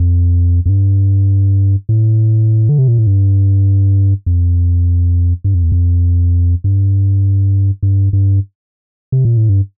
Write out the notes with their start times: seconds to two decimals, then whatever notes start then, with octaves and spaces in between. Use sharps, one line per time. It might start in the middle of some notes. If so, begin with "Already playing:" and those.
Already playing: F2
0.66 F2
0.69 G2
1.89 A2
2.69 D3
2.78 C3
2.88 A#2
2.98 A2
3.07 G2
4.26 F2
5.44 G2
5.54 F2
5.63 E2
5.72 F2
6.64 G2
7.83 G2
8.13 G2
9.12 C3
9.25 A#2
9.37 A2
9.49 G2